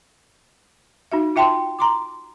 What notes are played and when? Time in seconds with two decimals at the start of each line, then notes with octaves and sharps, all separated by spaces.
1.12 D#4 F#4 E5
1.36 F4 E5 G5 A5 C6
1.79 A#5 C6 D6